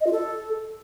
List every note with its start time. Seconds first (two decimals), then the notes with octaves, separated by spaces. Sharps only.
0.01 D#5
0.06 F4
0.12 A4